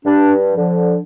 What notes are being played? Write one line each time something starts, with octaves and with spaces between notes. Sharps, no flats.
G2 D4
D3 F3